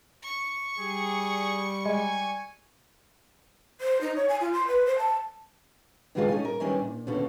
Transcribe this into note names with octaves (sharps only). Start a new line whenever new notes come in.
C#6
G3 G#4
G#3 G#5
C5
D#4
C#5
G#5
F4
C6
B4
C5
A5
B2 D#3 E3 G#3 F4 A4
C#4 D#4 A4 G#5
A#4
D#3 E3 G3 C#4 D4
A#2
D#2 B2 D3 C#4 F4 A4